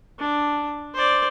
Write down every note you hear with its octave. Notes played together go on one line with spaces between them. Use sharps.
D4
C5 D5